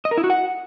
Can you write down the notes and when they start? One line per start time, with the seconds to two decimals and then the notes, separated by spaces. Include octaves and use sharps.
0.05 D#5
0.11 A#4
0.18 E4
0.24 F#4
0.30 F#5